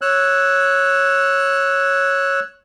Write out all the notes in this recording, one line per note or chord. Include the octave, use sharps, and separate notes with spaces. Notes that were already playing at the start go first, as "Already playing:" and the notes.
C#5 E6 F#6